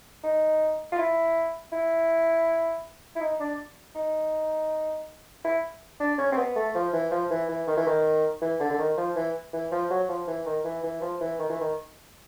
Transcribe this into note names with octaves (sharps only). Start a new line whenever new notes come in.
D#4
F4
E4
E4
E4
D#4
D4
D#4
E4
D4
C#4
C4
B3
A3
F3
E3
F3
E3
E3
D#3
E3
D#3
E3
D3
D3
D#3
F3
E3
E3
F3
F#3
F3
E3
D#3
E3
E3
F3
E3
D#3
E3
D#3